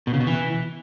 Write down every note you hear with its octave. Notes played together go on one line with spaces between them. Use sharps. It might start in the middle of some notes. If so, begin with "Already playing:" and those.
B2
C#3
B2
E3